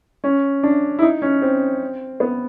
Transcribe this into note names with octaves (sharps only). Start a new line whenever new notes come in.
C#4
D4
E4
D#4
C#4
C4
B3